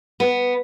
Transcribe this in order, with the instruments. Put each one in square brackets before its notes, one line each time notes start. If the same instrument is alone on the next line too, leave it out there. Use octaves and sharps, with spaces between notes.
[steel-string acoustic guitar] B3